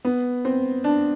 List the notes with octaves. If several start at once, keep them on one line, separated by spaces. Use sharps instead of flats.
B3
C4
D4